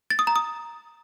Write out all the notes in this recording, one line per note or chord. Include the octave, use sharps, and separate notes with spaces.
A6
D#6
A#5
D#6